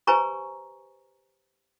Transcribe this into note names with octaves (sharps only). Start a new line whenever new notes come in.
G4 B4 C5 G#5 A#5 C#6